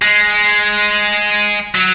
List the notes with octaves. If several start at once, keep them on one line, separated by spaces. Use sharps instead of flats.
G#3
F#3